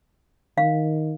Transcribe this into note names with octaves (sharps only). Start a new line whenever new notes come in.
D#3 F5